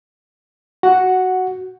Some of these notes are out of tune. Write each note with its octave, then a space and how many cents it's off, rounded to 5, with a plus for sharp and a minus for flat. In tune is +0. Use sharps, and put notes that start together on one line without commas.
F#4 +10 F#5 +0